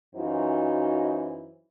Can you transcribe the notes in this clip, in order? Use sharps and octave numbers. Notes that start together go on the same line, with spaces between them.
F#2 E3 D#4 F4 F#4 C5